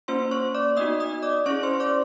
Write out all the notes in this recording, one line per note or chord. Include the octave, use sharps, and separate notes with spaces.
A#3 C#4 F4 C5 C6
C#5 C#6
D5 D6
B3 D#4 F#4 D#5 D#6
D#5 D#6
D5 D6
C#4 E4 G#4 C#5 C#6
C5 C6
D5 D6